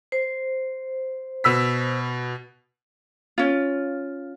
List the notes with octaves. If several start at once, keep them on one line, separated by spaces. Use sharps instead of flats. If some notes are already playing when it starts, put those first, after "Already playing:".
C5
B2 E6 B6
C#4 F4